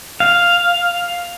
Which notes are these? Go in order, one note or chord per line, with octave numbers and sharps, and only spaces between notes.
F5